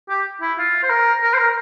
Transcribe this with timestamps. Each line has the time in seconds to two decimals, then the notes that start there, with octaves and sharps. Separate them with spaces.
0.10 G4
0.42 E4
0.58 F4
0.83 C5
0.90 A#4
1.23 A#4
1.34 C5
1.38 A#4